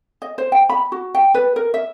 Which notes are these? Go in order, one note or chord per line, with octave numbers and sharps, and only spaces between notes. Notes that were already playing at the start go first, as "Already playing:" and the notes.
D#5
C5
G5
B5
F#4
G5
B4
A#4
E5